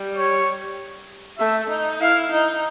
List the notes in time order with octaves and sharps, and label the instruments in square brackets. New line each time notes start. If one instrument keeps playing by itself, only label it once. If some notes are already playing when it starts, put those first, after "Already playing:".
Already playing: [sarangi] G3
[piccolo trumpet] C#5
[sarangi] A3 [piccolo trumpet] E5
[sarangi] D#4
[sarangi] E4 [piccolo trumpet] F5
[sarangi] D#4